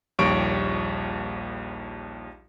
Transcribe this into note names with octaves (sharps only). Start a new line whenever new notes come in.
A#1 D#2 G3 C#5 C#6 D7